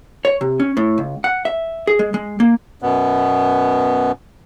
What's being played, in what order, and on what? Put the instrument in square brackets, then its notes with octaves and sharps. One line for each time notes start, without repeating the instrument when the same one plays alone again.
[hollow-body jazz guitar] C#5
C3
C#4
A2
C#2
F#5
E5
G#4
G#3
G#3
A#3
[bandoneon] F#2 B2 B3